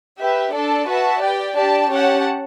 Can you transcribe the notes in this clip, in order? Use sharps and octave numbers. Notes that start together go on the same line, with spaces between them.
G4 B4 E5
D4 A4 D5 A5
F#4 B4 E5 A5
G4 D5 G5
D4 G4 D5 A5
C#4 G4 C#5 F#5 A5